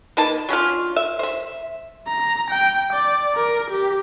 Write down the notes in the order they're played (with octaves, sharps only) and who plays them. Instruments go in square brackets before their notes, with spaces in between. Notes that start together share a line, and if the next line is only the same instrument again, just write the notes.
[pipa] A#3 D#4 B4 A5
F#3 C#4 D4 F4
E5
C5 E5
[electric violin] A#5
G5
D5
A#4
G4